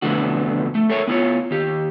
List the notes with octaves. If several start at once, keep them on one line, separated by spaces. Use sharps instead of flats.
F2 B2 D3 E3 A3 F#4
A3
A4 A#4 C#5 E5
B3 E4 F4 C#5
D#2 G4